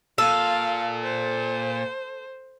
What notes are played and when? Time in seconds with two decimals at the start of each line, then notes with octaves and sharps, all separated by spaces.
0.18 A#2 A4 F5
1.03 C5